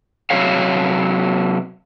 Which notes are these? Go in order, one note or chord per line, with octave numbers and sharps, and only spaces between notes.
C3 F#3 C#5 F5